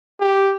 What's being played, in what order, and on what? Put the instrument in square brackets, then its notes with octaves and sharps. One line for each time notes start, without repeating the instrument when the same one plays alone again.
[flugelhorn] G4